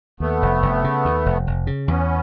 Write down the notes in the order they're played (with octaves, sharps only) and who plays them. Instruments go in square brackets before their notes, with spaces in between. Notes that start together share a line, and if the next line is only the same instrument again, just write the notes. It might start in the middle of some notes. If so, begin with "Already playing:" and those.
[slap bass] D#2 [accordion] A3 B3
[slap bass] F1
F1
C#3
D#2
F1
F1
C#3
[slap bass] E2 [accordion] B3 C#4